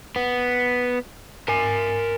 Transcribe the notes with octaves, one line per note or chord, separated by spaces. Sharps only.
B3
A#4 G#5